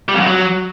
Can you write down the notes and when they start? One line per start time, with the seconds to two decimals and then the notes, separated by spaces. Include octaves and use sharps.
0.08 G3
0.14 F2
0.20 F#2
0.26 F#3